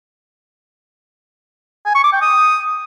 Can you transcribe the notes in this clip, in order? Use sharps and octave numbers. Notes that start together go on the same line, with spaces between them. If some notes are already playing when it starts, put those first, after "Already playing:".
G#5
C#6
D6
G5
D#6